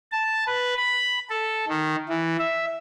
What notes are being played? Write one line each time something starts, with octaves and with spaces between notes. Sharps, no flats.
A5
B4
B5
A4
D#3
E3
E5